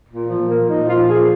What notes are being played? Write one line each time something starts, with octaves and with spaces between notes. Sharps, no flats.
A#2
F3
A#2
F3 A#3
A#2 D#4
F3 F4
A#2
F3 G#4